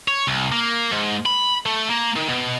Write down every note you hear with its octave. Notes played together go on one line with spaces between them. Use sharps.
C#5
C2
A#3
G#2
B5
A3
A#3
D#3
B2